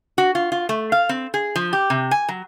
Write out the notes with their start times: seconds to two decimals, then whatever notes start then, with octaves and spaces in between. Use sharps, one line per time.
0.18 F#4
0.35 F4
0.52 F4
0.69 A3
0.92 F5
1.09 C4
1.34 G#4
1.56 F3
1.73 G4
1.90 C3
2.11 G#5
2.29 F#3